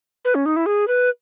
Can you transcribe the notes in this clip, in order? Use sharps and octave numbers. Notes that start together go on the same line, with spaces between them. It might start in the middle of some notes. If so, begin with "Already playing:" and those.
B4
C#4
D#4
E4
G#4
B4